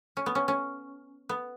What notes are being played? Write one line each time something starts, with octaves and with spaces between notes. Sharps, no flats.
C#4
B3
C#4
C#4
B3